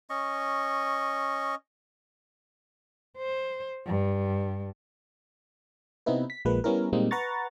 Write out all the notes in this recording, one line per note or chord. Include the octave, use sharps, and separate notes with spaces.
C#4 D#5 C#6
C5
G2
C3 B3 C4 D#4 E4 B4
B6
A#1 F3 G#3 A#3 B4
G3 B3 C#4 E4 A#4
A#2 G3 G#3 A#3 C4 D#4
B4 F#5 A#5 C#6 A6